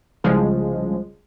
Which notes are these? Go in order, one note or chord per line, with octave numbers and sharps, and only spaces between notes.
C2 C#3 F3 G#3